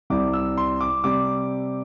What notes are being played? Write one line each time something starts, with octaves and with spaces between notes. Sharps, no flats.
C2 C3 G3 D6
E6
C6
D6
C3 G3 D6